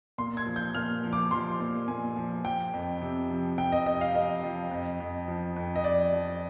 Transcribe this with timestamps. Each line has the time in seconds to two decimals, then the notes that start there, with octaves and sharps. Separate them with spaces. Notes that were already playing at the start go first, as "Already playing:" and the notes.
0.18 A#2 C6
0.37 G#6
0.46 F3
0.56 G6
0.75 A#2 F6
1.04 F3
1.13 D6
1.31 F3 C6
1.60 A#2
1.88 A#2 G#5
2.16 F3
2.45 F3 G5
2.73 F2
3.02 C3
3.30 F3
3.58 C3 G5
3.72 D#5
3.86 F2 D#5
4.01 F5
4.15 F2 D#5
4.43 F3
4.71 F2
5.00 F2
5.28 F3
5.56 F2
5.76 D#5
5.84 F2 D5
6.13 F3